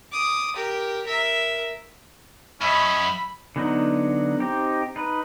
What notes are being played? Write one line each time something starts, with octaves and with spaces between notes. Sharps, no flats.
D6 D#6
G4 A#4
A#4 E5
F#2 C#4 D#5 E5 B5
D3 F#3 B3 D#4
C4 D#4 G4
D#4 B4